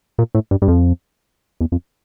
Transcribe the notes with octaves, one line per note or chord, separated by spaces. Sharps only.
A#2
A2
G2
G2
F2
E2
F2